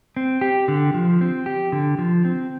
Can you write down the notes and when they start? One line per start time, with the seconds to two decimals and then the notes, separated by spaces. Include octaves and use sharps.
0.17 C4
0.41 G4
0.68 D3
0.94 F3
1.21 C4
1.46 G4
1.72 D3
1.99 F3
2.25 C4